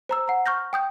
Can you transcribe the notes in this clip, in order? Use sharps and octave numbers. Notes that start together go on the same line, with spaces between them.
C5 A#5 E6
F#5 A#5
C#6 F6 G6 A#6
G5 D#6 G6